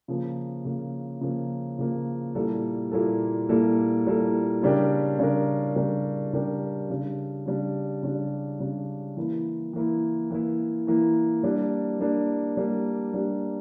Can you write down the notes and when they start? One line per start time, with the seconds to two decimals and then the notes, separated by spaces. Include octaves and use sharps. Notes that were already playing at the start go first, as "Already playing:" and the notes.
0.08 C#3 F3 A#3
0.65 C#3 F3 A#3
1.21 C#3 F3 A#3
1.78 C#3 F3 A#3
2.35 A#2 G3 A#3 E4 A4
2.92 A#2 G3 A#3 E4 A4
3.49 A#2 G3 A#3 E4 A4
4.06 A#2 G3 A#3 E4 A4
4.63 C#3 G3 D4 G4 A#4
5.19 C#3 G3 D4 G4 A#4
5.76 C#3 G3 D4 G4 A#4
6.33 C#3 G3 D4 G4 A#4
6.90 C#3 G3 D4
7.46 C#3 G3 D4
8.03 C#3 G3 D4
8.60 C#3 G3 D4
9.17 E3 A#3 E4
9.73 E3 A#3 E4
10.31 E3 A#3 E4
10.87 E3 A#3 E4
11.43 G3 A#3 D4
12.00 G3 A#3 D4
12.57 G3 A#3 D4
13.14 G3 A#3 D4